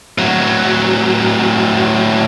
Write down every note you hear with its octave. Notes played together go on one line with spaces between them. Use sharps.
A2 F#3